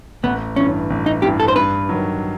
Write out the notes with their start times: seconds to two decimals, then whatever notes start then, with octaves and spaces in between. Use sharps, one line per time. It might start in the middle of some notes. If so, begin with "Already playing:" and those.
0.23 A1 B3
0.56 G2 E3 C#4
0.90 A1
1.06 D#4
1.22 G2 E3 G4
1.40 A4
1.48 C5
1.55 G2 B4
1.89 D#3 F#3